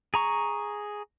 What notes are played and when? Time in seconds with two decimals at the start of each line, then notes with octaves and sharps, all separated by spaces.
0.14 G#4 A#5 C#6